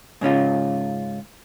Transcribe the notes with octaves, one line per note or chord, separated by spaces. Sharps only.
G#2 C#3 C#4 F4